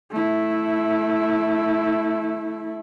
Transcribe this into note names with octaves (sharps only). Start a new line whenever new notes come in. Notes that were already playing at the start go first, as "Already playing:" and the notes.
A3 E4